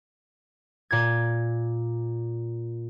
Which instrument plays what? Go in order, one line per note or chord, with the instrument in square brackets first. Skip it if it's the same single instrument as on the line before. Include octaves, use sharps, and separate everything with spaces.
[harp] A#2 G#6